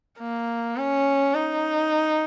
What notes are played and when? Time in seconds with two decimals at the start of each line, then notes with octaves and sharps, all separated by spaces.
0.19 A#3
0.77 C#4
1.35 D#4